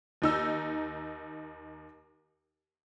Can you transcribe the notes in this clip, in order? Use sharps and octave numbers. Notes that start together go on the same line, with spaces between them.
D#2 D#4 E6